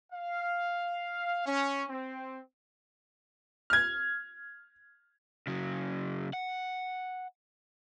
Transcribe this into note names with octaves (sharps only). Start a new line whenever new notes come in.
F5
C#4
C4
F6 G#6
C#3 F#3
F#5